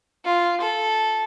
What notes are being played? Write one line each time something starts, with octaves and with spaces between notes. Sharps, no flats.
F4
A4